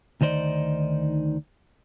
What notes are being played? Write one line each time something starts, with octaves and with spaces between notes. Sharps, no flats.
D2 D#3 D#4 C5 D5